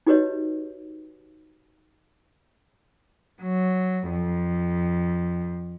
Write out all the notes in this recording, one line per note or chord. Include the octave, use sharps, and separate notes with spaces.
D#4 F#4 G4 B4 C#5 D#5
F#3
F2